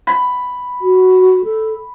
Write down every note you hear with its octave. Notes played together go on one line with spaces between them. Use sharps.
B5
F#4
A4